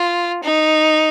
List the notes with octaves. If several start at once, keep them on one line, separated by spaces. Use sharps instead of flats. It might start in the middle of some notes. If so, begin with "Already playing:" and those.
Already playing: F4
D#4